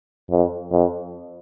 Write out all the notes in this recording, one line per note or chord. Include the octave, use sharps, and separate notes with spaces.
F2
F2